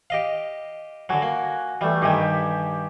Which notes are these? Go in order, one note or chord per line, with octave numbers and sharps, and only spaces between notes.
G4 D#5 F5
D3 F#3 F#4 F#5 G#5
A#3
E3 G3 A3
G2 D#3 G4 G#5 D#6